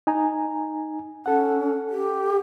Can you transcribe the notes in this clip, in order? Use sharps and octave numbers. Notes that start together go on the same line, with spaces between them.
D#4 G#5 A#5
C#4 A4 F#5
G4